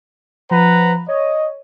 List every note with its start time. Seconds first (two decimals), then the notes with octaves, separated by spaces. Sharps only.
0.51 F3 B4 F#5 A#5
1.08 C#5 D#5